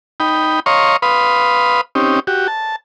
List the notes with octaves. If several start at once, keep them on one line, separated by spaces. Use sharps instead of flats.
D#4 G5 B5
C#5 D#5 F5 A#5 C6 C#6
B4 F5 B5 C6 D#6
C4 C#4 D#4 G4
F#4 G4
A5